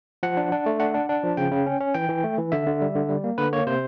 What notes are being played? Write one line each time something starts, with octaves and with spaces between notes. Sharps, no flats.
F3 F#5
D4
D4
A3
D4 F#5
D4
D4
F3
C#3 G5
C#3
C#4
C#4
E3 G5
E3
A3
E3
D3 E5
D3
G3
D3
G3
A#3
D3 B4
A#3 C#5
C3 C5